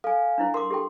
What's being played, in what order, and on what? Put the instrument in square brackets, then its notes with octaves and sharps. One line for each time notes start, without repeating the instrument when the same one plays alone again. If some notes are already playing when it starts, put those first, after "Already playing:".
[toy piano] A4 [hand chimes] F5 G#5
[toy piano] D4 E4 C5
[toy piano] A#4 F5 D6 [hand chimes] C6
[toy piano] G4 A4 G5